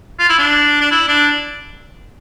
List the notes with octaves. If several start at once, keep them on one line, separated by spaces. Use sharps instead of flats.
F4
E4
D4
D4
E4
D4